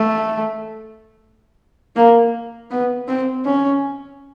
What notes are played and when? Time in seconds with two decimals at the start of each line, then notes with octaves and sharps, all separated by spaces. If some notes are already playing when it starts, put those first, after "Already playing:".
Already playing: A3
1.96 A#3
2.71 B3
3.08 C4
3.45 C#4